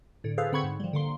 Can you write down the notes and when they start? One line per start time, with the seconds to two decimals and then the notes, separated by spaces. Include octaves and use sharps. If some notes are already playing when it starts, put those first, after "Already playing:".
0.24 A2 D3
0.38 G#4 A4 B4 C5 F5
0.52 D3 C4 F#5 B5 C#6 G#6
0.64 G#2
0.80 F3 G3
0.93 D3 A#3 C6